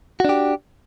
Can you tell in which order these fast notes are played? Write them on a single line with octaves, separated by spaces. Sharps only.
F#4 D4 G4